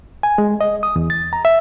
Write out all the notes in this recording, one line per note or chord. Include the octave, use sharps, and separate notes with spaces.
G#5
G#3
D#5
D#6
E2
A6
A#5
E5